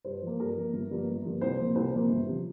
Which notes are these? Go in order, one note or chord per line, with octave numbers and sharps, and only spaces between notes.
G2 C5
F3 A#3
G2 A#4
F3 A#3
G1
G2 F3 A#3
G1
G2 F3 A#3
C2 C5
A#2 F3 A#3
C2 C5
A#2 F3 A#3
G1
C3 F3